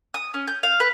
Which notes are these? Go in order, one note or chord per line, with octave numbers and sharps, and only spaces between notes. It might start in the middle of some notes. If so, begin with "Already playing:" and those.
D#6
C#4
G6
F5
B4